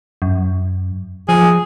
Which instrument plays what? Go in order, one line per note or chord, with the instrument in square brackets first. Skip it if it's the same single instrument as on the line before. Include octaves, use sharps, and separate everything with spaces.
[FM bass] F#2
[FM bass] F3 [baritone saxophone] G#4